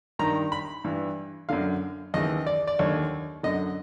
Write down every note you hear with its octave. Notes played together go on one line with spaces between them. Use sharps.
G2 D#3 A#5
B5
G2 E3
F#2 D3 F5
D#2 C#3 E3 D#5
D5
D5
D#2 D3 C#5
F#2 D3 D#5